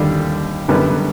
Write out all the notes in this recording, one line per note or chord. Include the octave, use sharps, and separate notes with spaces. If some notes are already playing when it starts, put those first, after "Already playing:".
Already playing: D#2 D3 G3
F#2 D3 G3 B3